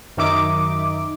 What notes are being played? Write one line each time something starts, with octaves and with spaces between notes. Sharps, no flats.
F#2 D#3 D#4 E5 D6